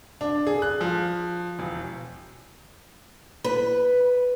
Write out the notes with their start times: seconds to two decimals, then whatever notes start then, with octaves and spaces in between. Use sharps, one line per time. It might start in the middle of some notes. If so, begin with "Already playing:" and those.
0.21 D4
0.47 G#4
0.62 F#6
0.81 F3
1.59 E1
3.44 B4